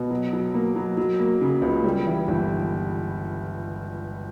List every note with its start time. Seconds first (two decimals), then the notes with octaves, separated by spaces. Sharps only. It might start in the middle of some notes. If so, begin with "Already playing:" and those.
Already playing: B2
0.11 F#3
0.33 F#3
0.54 A#3
0.76 F#3
0.97 F#3
1.19 A#3
1.41 C#3
1.62 C#2
1.84 G3
2.06 E3
2.28 G1